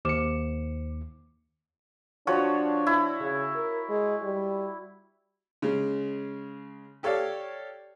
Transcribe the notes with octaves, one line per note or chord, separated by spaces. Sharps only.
D#2 C5 D6 C#7 E7
F3 D4 F#4 C#5
E4
C#3
A#4
G#3
G3
C#3 G#3
G4 A4 C#5 D5 F5